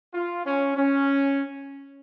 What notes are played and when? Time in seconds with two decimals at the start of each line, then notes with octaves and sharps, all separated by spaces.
0.14 F4
0.45 C#4
0.77 C#4